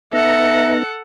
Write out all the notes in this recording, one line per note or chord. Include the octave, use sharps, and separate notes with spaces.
B3 D#4 A4 E5 F#5 A#5